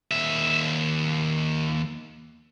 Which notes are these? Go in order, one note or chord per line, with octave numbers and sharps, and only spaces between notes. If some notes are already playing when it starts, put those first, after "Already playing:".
D#2 E5